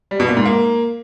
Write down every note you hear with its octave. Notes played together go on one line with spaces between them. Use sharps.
G3
B2
A#2
G#2
A#3